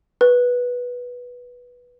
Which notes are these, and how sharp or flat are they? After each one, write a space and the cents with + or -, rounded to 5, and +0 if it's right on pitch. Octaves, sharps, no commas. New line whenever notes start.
B4 -10